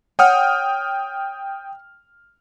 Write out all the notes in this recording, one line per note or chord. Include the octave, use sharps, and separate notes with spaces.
C#5 F#5 G5 D#6 F6